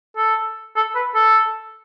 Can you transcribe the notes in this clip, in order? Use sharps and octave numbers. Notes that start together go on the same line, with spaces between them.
A4
A4
B4
A4